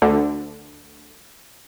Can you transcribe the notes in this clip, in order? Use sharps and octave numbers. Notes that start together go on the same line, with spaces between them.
D2 D3